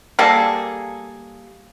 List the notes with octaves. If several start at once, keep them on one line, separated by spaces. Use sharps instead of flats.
G3 A#3 G#4 A4